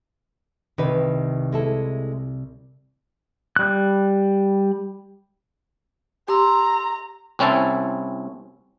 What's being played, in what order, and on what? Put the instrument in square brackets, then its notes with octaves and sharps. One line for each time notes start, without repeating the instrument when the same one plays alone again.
[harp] C2 [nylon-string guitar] D#3 B4
[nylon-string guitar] G#3 E4 A4
[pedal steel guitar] G3 F#6
[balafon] G4 [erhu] A#5 [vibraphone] C6 E6
[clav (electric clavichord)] C2 C4 C#4 E4 A5